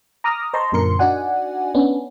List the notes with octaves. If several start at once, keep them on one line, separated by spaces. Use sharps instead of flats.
A#5 D6 D#6 F6 A#6
C5 D#5 A5 A#5 C6 C#6
F#2 A#2 D3 A#4 C6 C#7
D4 D#4 F#4 D5 F#5 G#5
B3 C#4 D4